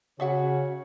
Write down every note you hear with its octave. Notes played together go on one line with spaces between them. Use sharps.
C#3 F#4 G#4 C#5 E5 F#5